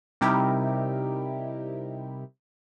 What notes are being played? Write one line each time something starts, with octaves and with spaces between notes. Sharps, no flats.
C3 G3 D#4 E4 G4 A#4